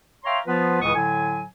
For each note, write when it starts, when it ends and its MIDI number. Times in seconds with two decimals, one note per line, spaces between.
0.24 0.38 73
0.24 0.38 76
0.24 0.38 77
0.24 0.38 79
0.24 0.38 82
0.24 0.38 84
0.47 0.81 53
0.47 0.81 59
0.47 0.81 65
0.47 0.81 71
0.81 0.94 37
0.81 0.94 45
0.81 0.94 49
0.81 0.94 52
0.81 0.94 85
0.81 0.94 87
0.94 1.43 45
0.94 1.43 50
0.94 1.43 54
0.94 1.43 69
0.94 1.43 80